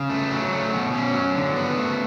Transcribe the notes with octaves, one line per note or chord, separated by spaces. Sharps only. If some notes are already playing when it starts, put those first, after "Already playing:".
Already playing: C#3
A3
F#3
A3
B2
C#4
F#3
D3
B3
A3